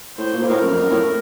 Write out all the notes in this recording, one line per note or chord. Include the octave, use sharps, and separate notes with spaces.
A2 C5
A#2
A#2
A2 A#4
F#2
F2
F#2
A2